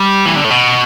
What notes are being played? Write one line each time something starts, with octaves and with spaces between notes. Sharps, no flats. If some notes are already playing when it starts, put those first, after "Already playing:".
Already playing: G3
E3
D3
A2
B2